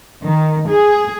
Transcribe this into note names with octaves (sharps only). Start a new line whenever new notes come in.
D#3
G#4